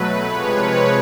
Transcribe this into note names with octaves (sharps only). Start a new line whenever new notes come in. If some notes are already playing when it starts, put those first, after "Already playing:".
Already playing: B2 F#3 A3 B4
C3 F3 G#3 B4 C#5
B4 C#5